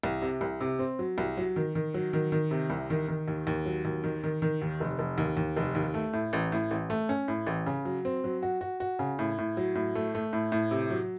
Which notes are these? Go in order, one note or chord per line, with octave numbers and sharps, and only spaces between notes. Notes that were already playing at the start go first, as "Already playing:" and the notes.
C2
C3
C2
C3
C4
F#3
C2
F#3
D#3
D#3
F#3
D#3
D#3
C3
C2
D#3
D#3
D#2
D#2
F#3
D#2
D#3
D#3
D#3
D#2
F1
F1
D#2
D#2
F1
D#2
A3
A2
A1
A2
A1
A3
C#4
A2
A1
C#3
F#3
C4
F#3
F#4
F#4
F#4
C#3
A2
A2
F#3
A2
A3
A3
A2
A2
C3
F#3